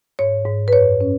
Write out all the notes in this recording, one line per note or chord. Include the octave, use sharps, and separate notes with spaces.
G#2 C#5
G#2
B4
F#2 C#5
C#4